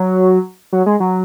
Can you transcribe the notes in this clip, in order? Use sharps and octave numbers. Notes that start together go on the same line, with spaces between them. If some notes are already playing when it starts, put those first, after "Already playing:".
Already playing: F#3
F#3
G#3
F#3